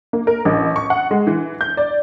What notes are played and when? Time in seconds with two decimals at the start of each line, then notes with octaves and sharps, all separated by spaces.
0.13 A#3
0.27 A#4
0.45 A1
0.76 C#6
0.90 F#5
1.11 G#3
1.27 E3
1.61 G6
1.77 D5